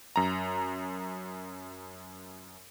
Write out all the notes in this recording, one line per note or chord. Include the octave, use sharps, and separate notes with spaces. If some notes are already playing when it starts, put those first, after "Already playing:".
F#2 A#5